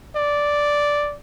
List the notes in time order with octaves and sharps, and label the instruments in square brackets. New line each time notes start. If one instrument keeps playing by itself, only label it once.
[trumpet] D5